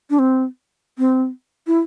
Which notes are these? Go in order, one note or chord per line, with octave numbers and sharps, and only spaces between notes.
D4
C4
C4
E4